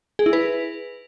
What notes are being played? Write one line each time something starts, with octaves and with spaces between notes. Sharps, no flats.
G#4
E4
B4